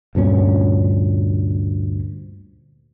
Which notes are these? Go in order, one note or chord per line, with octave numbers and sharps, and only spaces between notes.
D2 G2 A#2 C#4